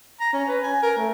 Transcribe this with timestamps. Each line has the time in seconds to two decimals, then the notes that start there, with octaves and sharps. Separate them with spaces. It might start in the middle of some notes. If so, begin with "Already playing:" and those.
0.20 A#5
0.33 C#4
0.49 B4
0.63 G#5
0.83 A#4
0.97 A3